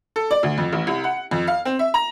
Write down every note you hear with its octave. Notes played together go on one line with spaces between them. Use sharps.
A4
D5
D2
F2
A1
C2
F#5
F2
F5
C4
E5
A#5